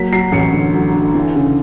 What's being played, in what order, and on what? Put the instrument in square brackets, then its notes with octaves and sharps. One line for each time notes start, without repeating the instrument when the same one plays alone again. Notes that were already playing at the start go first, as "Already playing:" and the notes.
Already playing: [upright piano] F#3 A#3 B6
F#3 C7
A1 C#7
D3
F#3
D3
E3
C#3